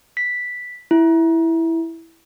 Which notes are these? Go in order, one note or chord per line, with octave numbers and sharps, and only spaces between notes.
B6
E4